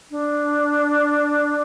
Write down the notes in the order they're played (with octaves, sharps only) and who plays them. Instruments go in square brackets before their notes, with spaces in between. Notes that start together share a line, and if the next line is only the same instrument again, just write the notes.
[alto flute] D4